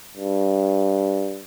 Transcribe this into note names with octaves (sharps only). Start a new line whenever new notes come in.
G2